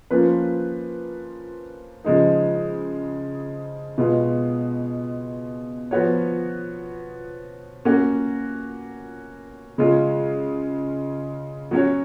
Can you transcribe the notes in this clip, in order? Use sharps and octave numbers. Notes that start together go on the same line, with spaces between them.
F3 A#3 C#4 F4 B4
C#3 F3 G#3 D#4
B2 G#3 B3 F4
F3 B3 F#4 C#5
A#3 C#4 F#4
C#3 G#3 C#4 F4
F#3 C#4 F#4 C#5